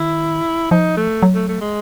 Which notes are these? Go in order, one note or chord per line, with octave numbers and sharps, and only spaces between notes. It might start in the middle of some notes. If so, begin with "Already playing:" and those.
Already playing: D#3 E4
F3 D#4
A3
F#3
A3
A3
G#3